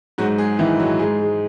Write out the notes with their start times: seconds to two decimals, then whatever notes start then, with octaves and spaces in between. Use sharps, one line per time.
0.18 G#2 F#3 F#4
0.38 G#3 G#4
0.59 D#3 E3 E4
0.79 G#2 F#3 F#4
0.99 G#2 G#3 G#4
1.19 G#3